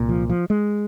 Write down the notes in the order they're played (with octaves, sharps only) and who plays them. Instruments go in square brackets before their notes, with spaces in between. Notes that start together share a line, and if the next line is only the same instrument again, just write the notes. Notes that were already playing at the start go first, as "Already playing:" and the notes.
Already playing: [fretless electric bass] C2 A#2
F3
F3
G#3